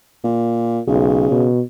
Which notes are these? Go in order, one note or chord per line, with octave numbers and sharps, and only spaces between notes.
A#2
B1 C#3
B2